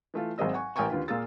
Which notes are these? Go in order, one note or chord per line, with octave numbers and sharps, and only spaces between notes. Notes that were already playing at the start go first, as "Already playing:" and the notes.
E3 A3 F4
G#1 F#3 C4 G#4 D#5 E6
F#5 G#5 C#6
A1 A#4 G5 G#5 C#6
D#2 D3 F4 B4
A#2 A#3 F4 G#4 E6 A6